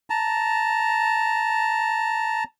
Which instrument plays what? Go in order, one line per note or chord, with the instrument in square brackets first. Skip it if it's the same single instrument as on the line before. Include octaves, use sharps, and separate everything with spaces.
[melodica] A5 A#5